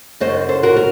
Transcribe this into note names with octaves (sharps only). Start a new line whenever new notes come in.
F#2 C#3 F#3 C5 D#5
A4 C5
F#4 A#4
A#4